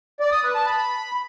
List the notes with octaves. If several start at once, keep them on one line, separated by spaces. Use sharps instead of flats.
D5
D#6
B4
A5
B5